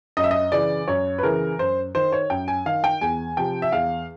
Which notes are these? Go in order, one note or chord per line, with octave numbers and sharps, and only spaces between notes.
F#2 D#5
E5
D#5
C#3 E3 D5
F#2 C#5
B4
C#3 E3 A#4
F#2 C5
D#3 C5
C#5
F#2 G5
G#5
D#3 F5
G5
E2 G#5
C3 F3 G5
E5
E2 F5